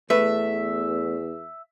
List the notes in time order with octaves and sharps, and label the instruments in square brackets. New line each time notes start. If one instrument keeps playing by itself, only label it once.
[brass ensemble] E2 [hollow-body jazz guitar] A3 B4 [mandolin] E5